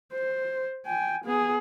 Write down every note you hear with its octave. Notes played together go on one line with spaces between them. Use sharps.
C5
G5 G#5
B3 G#4